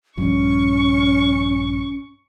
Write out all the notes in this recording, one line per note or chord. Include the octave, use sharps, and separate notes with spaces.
A#1 G2 F3 C#4 C#6